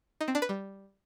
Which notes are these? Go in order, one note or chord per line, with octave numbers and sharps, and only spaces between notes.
D#4
C4
D4
B4
G3